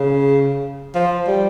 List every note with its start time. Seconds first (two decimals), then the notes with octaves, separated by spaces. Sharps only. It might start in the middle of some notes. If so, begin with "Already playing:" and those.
Already playing: C#3
0.95 F3
1.27 G3